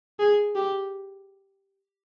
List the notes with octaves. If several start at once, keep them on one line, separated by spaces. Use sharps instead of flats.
G#4
G4